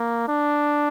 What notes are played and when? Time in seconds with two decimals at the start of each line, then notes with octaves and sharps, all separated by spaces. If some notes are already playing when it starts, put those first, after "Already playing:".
Already playing: A#3
0.29 D4